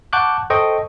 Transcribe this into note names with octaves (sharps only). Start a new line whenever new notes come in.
F#5 A5 C#6 D6 F#6 G6
A4 C5 D#5 G5 C#6 D#6